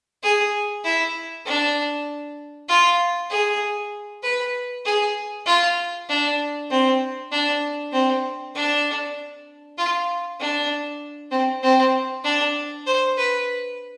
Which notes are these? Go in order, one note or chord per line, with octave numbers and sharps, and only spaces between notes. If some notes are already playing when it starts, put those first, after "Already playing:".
G#4
E4
D4
F4
G#4
B4
G#4
F4
D4
C4
D4
C4
D4
F4
D4
C4
C4
D4
C5
B4